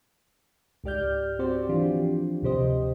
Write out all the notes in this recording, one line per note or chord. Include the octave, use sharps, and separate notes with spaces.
C#2 G#2 G4 D5 F6 G6
C4 F#4 G4 C5 D5
E3 F3 D4 F4 G4
D2 C3 G4 C5 D#5